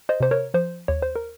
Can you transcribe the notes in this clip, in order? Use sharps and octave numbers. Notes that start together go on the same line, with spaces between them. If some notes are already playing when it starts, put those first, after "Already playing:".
C5 D#5
C3 C5
A#4 C#5
F3 C5
D#2 C#5
C5
A#4